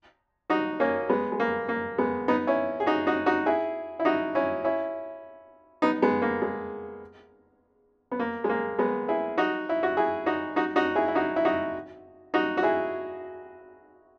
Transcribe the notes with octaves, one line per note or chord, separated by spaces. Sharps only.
D#4 F#4
A#3 C#4
G#3 B3
G#3
A#3
A#3
G#3 B3
B3 D#4
C#4 E4
G#4
D#4 F#4
D#4 F#4
D#4 F#4
E4 G#4
E4
D#4 F#4
C#4 E4
C#4 E4
B3 D#4
G#3 B3
A#3
G#3
B3
A#3
G#3
A#3
G#3 B3
E4 G#4
D#4 F#4
E4
F#4
E4 G#4
D#4 F#4
D#4 F#4
D#4 F#4
E4 G#4
E4
D#4 F#4
E4
D#4 F#4
D#4 F#4
F#4
E4 G#4